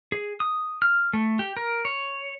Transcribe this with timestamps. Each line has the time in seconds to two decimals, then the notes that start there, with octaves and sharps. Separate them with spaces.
0.12 G#4
0.40 D#6
0.82 F6
1.13 A3
1.39 G4
1.57 A#4
1.85 C#5